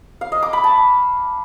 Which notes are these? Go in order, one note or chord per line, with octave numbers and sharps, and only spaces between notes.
F5
D#5
D6
B5
A5